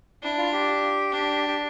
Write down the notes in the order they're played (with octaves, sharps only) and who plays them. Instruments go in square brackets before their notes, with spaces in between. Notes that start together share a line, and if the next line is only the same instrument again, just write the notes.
[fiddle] D4 [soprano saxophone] E4
[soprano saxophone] F4
G4
[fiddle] D4
[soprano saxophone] G4